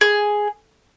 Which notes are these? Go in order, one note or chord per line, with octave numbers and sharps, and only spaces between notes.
G#4